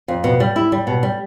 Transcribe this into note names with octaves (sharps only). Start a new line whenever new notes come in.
F2
B2
G3
E4
G3
B2
G3